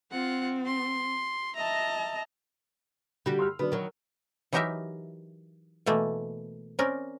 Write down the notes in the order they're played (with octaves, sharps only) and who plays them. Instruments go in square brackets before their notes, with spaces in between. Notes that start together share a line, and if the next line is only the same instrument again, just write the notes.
[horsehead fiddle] C4 [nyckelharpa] F4 F#5
[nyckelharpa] C6
[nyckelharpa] D#5 A#5 [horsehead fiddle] E5 A5
[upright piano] D3 [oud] G3 F#4 G4
[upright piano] C6 E6 F6
[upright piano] D3 F#3 D4 [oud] B3
[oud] D#3 F#3 [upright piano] A#4
[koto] E3 F#3 D#4 G4 A#4 E5
B2 E3 A3 A#3
C4 C#4 A#4 D5